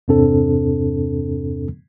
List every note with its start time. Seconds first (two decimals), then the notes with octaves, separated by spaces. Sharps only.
0.08 E2 G2 C3 C4 D4 A4